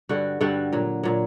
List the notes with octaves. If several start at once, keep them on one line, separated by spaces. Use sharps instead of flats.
G2 D3 G3 F#4
G2 D3 G3 F#4
A#2 F#3
A#2 F#3